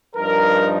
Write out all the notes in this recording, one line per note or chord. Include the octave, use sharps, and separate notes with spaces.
G2 F3 D#4 A#4